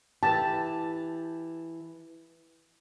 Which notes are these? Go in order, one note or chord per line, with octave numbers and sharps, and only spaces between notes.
E3 G4 A5